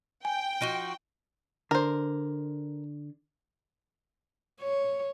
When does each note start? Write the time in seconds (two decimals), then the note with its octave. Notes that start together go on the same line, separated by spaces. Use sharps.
0.25 G5 G#5
0.61 F3 D#4 F#4 D7 D#7 G7
1.71 D3 A#4 C5
4.61 C#5